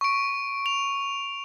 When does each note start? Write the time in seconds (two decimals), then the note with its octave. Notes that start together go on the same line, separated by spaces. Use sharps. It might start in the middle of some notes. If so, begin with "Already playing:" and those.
0.01 C#6 D7
0.66 F7